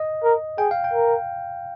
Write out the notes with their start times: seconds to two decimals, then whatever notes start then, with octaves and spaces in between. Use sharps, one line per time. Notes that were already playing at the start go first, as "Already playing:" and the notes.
Already playing: D#5
0.23 A#4
0.58 G#4 G5
0.71 F5
0.84 G5
0.93 A#4